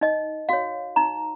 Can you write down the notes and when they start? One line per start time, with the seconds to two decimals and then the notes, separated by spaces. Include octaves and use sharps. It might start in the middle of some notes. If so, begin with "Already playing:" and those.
0.01 D#4 D#5
0.49 F#4 C#5 F5
0.96 D#4 A#5